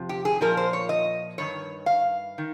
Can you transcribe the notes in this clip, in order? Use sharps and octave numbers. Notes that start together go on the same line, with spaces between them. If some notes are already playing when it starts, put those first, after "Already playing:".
Already playing: F2 C3 F3
G4
G#4
A#2 F3 A#4
C5
C#5
D#5
G2 D#3 C#5
F5
D#3